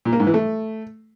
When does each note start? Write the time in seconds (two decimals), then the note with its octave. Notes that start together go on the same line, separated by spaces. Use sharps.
0.05 A#2
0.13 A#3
0.20 G#2
0.27 E3
0.34 A3